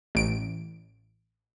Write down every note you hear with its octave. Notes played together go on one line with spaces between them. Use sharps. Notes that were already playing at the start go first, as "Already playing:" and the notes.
A1 D7